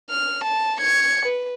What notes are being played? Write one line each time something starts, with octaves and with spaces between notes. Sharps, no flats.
F6
A5
G#6 C#7
B4